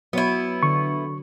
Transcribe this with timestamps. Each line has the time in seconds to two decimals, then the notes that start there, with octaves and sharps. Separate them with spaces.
0.13 F#3 B3 E4 C#5
0.63 D3 C#6